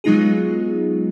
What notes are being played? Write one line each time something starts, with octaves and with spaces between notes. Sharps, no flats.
F#3 G#3 B3 D#4 F4 G#4